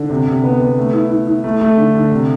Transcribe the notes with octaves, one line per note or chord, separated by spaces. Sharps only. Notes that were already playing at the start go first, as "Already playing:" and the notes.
Already playing: D3
C3
C3
B3
B3
A3
E4
E4
E4
A3
A3
D3
D3
C3